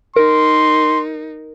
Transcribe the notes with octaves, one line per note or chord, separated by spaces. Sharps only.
D#4 A#4 C6